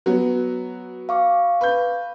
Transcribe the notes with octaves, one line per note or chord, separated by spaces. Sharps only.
F#3 B3 F#4
F5 C#6 D6
B4 G6